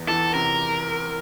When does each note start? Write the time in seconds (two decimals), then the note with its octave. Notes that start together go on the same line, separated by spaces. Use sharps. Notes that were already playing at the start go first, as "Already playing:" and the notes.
Already playing: E2 B3
0.08 E3 A4
0.34 C3 A#4